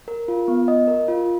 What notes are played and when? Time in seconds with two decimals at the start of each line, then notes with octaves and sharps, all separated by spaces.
0.08 A#4
0.28 F4
0.48 B3
0.68 D#5
0.87 A#4
1.08 F4